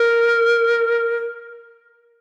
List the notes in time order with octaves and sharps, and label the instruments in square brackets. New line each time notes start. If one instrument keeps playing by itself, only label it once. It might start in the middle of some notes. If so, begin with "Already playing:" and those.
Already playing: [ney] A#4